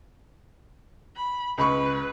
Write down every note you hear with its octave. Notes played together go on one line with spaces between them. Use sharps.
B5
C#2 B4 B5 C#6